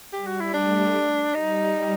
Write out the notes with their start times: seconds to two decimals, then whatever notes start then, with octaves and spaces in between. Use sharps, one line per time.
0.13 G3 G4
0.26 F#4
0.40 E4
0.53 G3 A3 D4
1.34 G3 D#4